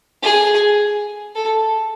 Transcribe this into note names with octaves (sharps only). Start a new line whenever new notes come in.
G#4
A4